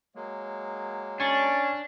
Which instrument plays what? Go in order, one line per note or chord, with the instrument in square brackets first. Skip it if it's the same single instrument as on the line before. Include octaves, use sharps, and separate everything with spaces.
[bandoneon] F#3 G#3 A#3
[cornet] C#4 [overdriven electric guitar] D4 [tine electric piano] G#5 C#6 A6